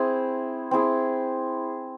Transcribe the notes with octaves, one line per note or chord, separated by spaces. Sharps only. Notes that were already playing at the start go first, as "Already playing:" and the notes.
Already playing: C4 E4 G#4
C4 E4 G#4